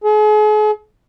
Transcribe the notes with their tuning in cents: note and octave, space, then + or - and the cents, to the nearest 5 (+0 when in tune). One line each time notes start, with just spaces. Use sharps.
G#4 +40